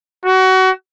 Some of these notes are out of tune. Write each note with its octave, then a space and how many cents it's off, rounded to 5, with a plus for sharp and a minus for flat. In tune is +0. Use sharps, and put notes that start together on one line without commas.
F#4 +25